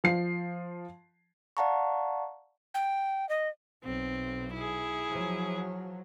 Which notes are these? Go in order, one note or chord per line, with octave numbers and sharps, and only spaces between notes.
F3 C7
D5 F5 F#5 A5 A#5 C#6
G5
D#5
B1 C4
E4 G#4
F3 F#3